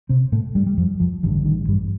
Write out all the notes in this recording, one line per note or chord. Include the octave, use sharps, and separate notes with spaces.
C3 C4
A2 A3
G2 G3
G3
F2 F3
F2 F3
A1 G2 D3 D#3
D#3
G2 G3